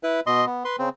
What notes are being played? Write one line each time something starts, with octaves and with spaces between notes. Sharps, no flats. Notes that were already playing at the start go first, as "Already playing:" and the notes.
E4 B4
B2 D#5 C6
B3
B4 C6
C#3 C4